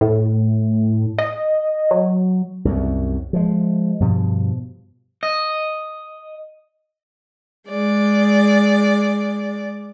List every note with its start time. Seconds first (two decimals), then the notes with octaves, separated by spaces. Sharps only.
0.01 A2
1.19 D#5
1.91 F#3
2.65 C2 F#2
3.33 F3 G#3
4.00 G2 B2 F3
5.23 D#5
7.68 G#3 D5